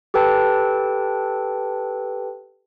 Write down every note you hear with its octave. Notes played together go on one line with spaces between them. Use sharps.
G4 A4 B4 G5 A5